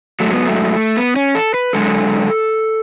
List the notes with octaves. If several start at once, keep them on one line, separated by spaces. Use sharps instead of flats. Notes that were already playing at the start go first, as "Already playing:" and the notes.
G#2 F#3 A3
B3
A3
B3
C#4
A4
B4
F#2 D3 G#3 A4